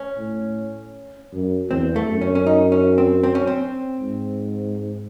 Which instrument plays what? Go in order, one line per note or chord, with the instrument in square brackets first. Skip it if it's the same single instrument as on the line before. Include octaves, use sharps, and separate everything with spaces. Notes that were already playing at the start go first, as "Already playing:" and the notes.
Already playing: [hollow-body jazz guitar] C#4
[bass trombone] A2
F#2
[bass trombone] E2 [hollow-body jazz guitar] C4
[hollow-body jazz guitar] A3
[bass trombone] F#2
[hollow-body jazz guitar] C#4
C#4
D#4
C#4
C4
C4
C#4
C4
[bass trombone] G#2